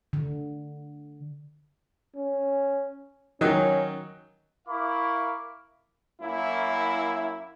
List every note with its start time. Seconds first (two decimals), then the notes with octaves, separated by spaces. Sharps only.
0.13 D3
2.16 C#4
3.41 D#3 F#3 C#4 D#4
4.68 E4 A#4 F5 B5 C#6 D6
6.21 F#2 A#3 E4